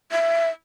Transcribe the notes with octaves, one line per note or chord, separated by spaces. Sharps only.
E5